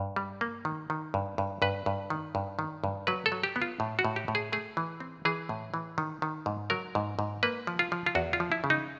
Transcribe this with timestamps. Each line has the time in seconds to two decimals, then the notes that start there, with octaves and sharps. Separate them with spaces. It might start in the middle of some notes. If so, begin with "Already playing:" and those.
Already playing: G2
0.16 G3
0.41 A#3
0.65 D#3
0.90 D#3
1.14 G2
1.38 G2
1.62 G2 B4
1.86 G2
2.10 D#3
2.35 G2
2.59 D#3
2.84 G2
3.07 F#3 B4
3.26 A4
3.32 F#3
3.43 G4
3.56 B3
3.62 F4
3.80 A2
3.99 F#4
4.05 A2
4.16 G4
4.28 A2
4.35 G#4
4.52 A3 G#4
4.77 E3
5.00 C4
5.25 E3 G#4
5.49 A2
5.74 E3
5.98 D#3
6.22 D#3
6.46 G#2
6.70 F#3 A#4
6.95 G#2
7.19 G#2
7.43 A#3 B4
7.67 F3
7.79 F4
7.92 F3
8.06 F4
8.15 E2 F#4
8.33 F4
8.40 F3
8.52 E4
8.64 C#3
8.70 D#4